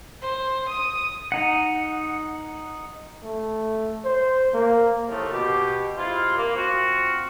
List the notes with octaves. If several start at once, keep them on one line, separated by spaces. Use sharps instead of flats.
C5
D#6
D#4 F#5
A3
C5
A#3
C2 A2 D#3 F3 A3 A#3
B2 G4
C3 G#3 E4 F4
A#3
C4 F4 F#4